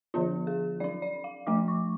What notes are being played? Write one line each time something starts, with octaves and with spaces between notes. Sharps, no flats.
D3 F3 B3 D4 F4
G#4
F#3 C#4 D5
D5
F5
F3 A3 D4 D6
C#6